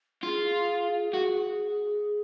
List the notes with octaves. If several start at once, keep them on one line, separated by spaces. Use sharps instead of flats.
F4 G#4
F#4